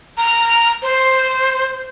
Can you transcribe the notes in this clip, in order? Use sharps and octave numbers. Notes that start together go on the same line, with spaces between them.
A#5
C5